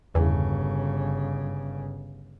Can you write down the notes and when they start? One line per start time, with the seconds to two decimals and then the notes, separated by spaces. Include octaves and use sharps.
0.15 G1 E2 C#3